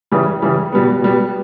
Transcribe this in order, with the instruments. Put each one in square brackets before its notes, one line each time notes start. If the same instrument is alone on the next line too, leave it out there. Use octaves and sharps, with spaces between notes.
[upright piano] C#3 E3 G3
C#3 E3 G3
B2 G3 B3
B2 G3 B3